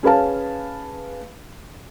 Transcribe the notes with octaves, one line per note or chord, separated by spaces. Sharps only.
C#4 G#4 B4 F5 A5